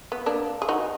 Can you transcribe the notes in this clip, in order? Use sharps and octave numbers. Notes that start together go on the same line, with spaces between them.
B3
A#3 D4
G#4
D#4 F#4